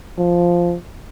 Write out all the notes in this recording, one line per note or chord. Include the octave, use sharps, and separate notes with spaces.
F3